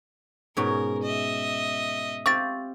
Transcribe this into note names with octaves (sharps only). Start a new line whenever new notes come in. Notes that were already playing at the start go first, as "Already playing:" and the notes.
G#2 B2 C#4 A#4
D#5 E5
C4 F4 G4 C#6 A6